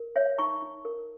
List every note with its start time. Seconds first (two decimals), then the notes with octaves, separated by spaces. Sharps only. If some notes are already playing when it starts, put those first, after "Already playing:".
Already playing: A#4
0.16 C#5 E5
0.38 D#4 A#5 C#6
0.62 D#4
0.85 A#4